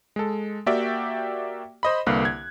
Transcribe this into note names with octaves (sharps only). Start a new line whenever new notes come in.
G#3 A4
A#3 F#4 G4 D5 E5 G5
C5 D#5 B5
C2 D3 A#3 B4 F5 F#6
G#6